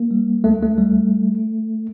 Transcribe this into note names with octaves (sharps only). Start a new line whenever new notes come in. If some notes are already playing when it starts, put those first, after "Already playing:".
Already playing: A#3
G3
D2 A3
A3
G3